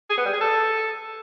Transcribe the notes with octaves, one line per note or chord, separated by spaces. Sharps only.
G#4
B3
G3
G#4
A4